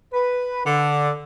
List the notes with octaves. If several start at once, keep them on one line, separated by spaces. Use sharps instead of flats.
B4
D3